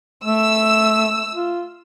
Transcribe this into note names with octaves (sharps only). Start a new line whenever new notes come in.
A3 E6
F4